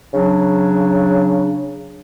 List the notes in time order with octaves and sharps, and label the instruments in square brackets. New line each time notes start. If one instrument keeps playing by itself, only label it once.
[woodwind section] C#3 F#3 D4